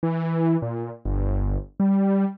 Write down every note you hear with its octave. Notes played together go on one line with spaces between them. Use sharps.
E3
A#2
G1
G3